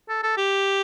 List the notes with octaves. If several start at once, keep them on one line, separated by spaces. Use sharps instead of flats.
A4
A4
G4